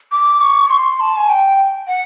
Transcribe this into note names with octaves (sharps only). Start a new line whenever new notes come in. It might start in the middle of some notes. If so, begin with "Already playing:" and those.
D6
C#6
C6
A5
G#5
G5
F#5